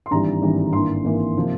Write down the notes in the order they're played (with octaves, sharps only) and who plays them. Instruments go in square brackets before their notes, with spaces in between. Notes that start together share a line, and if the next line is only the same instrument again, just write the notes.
[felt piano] C6
G#1 G2 E3 G3 A#5
G#1 G2 E3 G3
G#1 G2 E3 A#3 C6
G#1 G2 E3 A#3
C3 F3 A#3